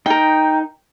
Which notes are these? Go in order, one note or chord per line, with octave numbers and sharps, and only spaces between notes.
D#4 A#4 G5